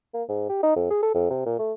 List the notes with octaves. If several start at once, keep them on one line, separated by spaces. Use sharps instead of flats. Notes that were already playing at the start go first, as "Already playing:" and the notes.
A#3
G#2
G4
D#4
F2
G#4
A4
F2
C3
A#2
A3